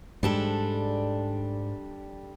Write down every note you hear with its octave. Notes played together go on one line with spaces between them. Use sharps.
G#2 G3 G#3 D4 A4